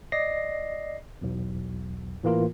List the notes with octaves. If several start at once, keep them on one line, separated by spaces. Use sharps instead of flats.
D5 D#5 A#6 C7
B1 E2
A2 E3 A#3 F4 A#4